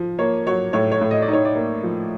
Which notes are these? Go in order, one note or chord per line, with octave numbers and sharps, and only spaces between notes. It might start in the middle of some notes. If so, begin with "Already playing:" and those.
Already playing: F3
A#3 C#5
F#3 C#5
A2 C#5
C#5
A2
D#5
D5
D#4
C#5
D5
A#3
F3